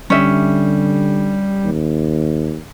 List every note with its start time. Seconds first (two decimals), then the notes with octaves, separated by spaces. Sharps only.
0.10 D3 G3 C#4 E5
1.65 D#2